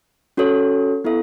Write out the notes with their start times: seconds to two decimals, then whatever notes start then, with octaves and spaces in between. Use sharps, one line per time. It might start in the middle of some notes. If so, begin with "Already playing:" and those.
0.37 C#4 F#4 A4 C#5
1.04 B3 E4 A4 E5